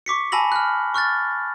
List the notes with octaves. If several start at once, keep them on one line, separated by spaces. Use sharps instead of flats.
C#6 D6 B6 C#7
G#5 A5 B5 E6 A#6 F#7
F6 F#6
C#6 F6 F#6 A6